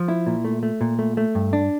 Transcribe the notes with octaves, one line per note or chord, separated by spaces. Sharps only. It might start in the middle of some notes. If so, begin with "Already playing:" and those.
Already playing: F3
E4
A#2
A3
A3
A#2
A3
A3
G2
D4